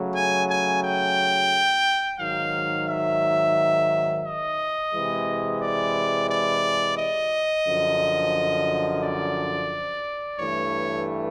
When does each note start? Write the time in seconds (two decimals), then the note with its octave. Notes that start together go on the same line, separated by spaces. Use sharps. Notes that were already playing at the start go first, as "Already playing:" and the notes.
Already playing: C#3 F#3 A3
0.15 G#5
0.50 G#5
0.83 G5
2.19 G#2 D#3 F#3 F5
2.88 E5
4.25 D#5
4.93 C3 E3 G#3
5.62 D5
6.30 D5
6.98 D#5
7.66 F#2 D3 F3
9.04 D5
10.39 G2 E3 A3 C#5